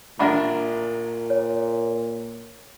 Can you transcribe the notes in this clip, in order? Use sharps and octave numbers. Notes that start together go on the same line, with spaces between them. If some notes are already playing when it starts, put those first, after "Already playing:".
A1 A#2 D4 A#4 E5 F#5 B5
C#5